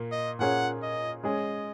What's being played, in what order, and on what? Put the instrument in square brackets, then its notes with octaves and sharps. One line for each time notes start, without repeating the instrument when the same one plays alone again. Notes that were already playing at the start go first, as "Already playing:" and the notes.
Already playing: [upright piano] A#2 A#3
[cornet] D#5
[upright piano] A#2 A#3 C#4 G#4 C#5 [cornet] F#5
[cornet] D#5
[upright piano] G#3 C#4 G#4 [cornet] D#5